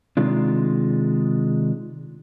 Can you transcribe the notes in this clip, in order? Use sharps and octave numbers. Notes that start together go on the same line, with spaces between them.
C3 D#3 G#3 D4 F4